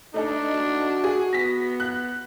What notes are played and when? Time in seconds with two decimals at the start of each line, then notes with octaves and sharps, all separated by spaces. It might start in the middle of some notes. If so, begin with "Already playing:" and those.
0.14 A3 D4 D#4 A4
0.52 F#4
1.04 G#4
1.33 B3 A#6 B6
1.80 F#6